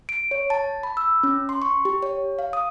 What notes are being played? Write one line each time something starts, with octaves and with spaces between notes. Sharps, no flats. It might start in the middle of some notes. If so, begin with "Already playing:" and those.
D7
C#5
A5
B5
E6
C#4
C6
C#6
G4
C#5
F5
D#6